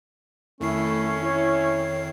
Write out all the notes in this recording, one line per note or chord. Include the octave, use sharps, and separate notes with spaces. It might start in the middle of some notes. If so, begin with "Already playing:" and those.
F2 D#3 A3 C#4 E4 C7
E4 C#5